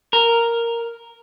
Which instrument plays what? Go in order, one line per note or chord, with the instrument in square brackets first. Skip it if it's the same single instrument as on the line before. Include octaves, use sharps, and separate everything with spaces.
[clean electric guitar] A#4